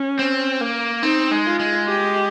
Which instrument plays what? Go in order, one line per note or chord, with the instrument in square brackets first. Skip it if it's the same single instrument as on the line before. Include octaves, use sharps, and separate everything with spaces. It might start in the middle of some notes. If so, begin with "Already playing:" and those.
Already playing: [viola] C#4
[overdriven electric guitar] C4
A#3
[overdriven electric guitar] C4 [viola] D#4
[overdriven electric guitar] G#3
[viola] F4
[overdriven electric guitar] G#3
[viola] G4